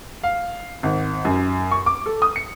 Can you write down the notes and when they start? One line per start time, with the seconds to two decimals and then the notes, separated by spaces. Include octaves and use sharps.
0.23 F5
0.83 G#1
1.25 F#2
1.72 C#6
1.86 D6
2.06 A4
2.22 D#6
2.36 C#7